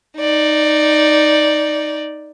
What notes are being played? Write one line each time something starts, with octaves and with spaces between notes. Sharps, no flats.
D#4 D5